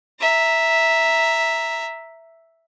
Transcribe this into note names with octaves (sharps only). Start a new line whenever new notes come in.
E5 A#5